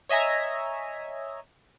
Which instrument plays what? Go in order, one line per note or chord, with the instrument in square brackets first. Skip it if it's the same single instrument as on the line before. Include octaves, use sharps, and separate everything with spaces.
[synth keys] C#5 D#5 E5 G#5 A#5